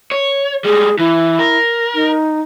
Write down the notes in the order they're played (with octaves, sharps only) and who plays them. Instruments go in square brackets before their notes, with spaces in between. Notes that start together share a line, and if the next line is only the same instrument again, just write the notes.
[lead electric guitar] C#5
[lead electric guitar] G3 G#3 [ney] G#4
[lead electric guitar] E3 [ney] E4
[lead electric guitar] A#4
[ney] D#4